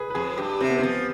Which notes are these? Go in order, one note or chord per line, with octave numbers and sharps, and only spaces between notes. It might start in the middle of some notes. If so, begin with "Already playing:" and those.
Already playing: G#4 B4
B4
F2 G#4
G2 G4
C3 C4
B3
F3 C4